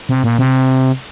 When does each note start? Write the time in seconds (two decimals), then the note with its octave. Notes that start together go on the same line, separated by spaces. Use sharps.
0.09 C3
0.24 A#2
0.39 C3